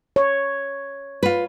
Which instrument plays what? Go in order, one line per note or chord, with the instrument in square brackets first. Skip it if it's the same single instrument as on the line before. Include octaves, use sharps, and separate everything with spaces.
[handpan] C#5
[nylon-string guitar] F4 B4